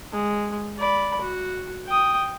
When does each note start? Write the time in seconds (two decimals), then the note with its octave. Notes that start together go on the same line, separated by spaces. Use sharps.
0.12 G#3
0.78 D5 B5
1.21 F#4
1.87 G5 D#6